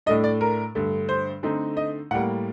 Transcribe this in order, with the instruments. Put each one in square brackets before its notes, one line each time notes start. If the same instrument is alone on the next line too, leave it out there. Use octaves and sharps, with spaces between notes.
[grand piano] A2 A3 D4 D#5
D5
A#4
G2 D3 A3
C5
D3 A3 C4 D#4
D#5
A2 G3 A#3 F#5